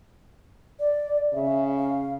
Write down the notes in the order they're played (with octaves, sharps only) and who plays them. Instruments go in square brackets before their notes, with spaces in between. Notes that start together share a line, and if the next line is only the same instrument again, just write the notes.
[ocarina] D5
[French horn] C#3 [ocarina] E5
[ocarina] F5